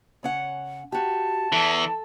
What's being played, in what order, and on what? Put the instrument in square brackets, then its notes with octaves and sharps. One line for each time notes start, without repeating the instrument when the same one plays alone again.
[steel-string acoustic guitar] C#3 C#4 F#5
[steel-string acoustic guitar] F#4 G4 [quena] A5
[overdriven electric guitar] E2 E3 [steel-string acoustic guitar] A4